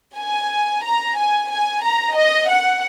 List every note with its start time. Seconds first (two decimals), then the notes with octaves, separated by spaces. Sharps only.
0.17 G#5
0.82 A#5
1.17 G#5
1.50 G#5
1.82 A#5
2.15 D#5
2.49 F#5